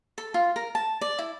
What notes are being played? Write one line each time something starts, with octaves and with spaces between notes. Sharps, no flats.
A4
F4
A#4
A5
D5
E4